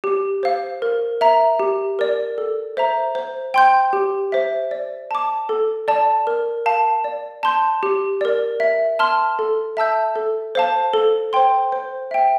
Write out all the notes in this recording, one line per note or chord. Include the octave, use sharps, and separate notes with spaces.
G4
C5 F5
A#4
E5 A#5
G4
A#4 D5
A4
C5 E5 A#5
C5
G5 C6 G6
G4
C5 E5
D5
A5 D6
A4
D5 A5
A#4
F5 A5
D5
A5 C6 G6
G4
A#4 D5
E5
A5 C6 F6
A4
E5 A5 E6 G6
A4
C5 F5 A5
A4
C5 G5 C6
C5
E5 G5